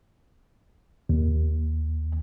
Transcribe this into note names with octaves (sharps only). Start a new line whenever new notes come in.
D#2